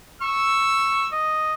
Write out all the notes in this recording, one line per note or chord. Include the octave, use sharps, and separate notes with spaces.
C#6 E6
D#5